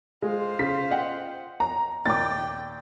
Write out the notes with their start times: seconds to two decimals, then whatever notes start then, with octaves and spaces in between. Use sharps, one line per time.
0.22 G#3 F4 C5
0.59 C#3 B6
0.91 D#5 F#5 G5
1.60 A#5
2.06 D#2 A#2 G5 D6 A6